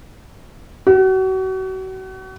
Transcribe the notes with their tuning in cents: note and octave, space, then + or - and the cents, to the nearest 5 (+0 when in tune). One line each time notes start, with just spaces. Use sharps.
F#4 +35